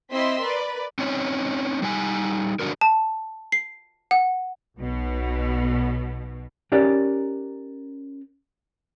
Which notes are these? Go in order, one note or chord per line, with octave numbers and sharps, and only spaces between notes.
C4 E4 D#5 C6 E6 B6
A#4 B4 D5
C4 C#4 D#4 C#5
G3 D#4 G#5
D3 D4 F#4 A#4
A5
C7
F#5
B1 B2
C#4 D#4 G4 A#4 B4 D5